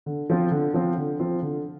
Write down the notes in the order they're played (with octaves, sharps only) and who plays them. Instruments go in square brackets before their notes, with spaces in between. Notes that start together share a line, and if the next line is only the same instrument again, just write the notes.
[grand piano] D3
F3 C4 F4
D3
F3 C4 F4
D3
F3 C4 F4
D3